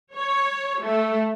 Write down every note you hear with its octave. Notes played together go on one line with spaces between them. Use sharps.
C#5
A3